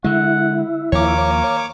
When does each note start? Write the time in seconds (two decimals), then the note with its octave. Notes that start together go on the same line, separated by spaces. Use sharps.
0.04 D3 G#3 E4 F#5
0.92 D#2 F3 A#3 C#5 D6